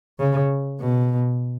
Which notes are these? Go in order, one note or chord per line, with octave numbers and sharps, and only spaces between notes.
C#3
B2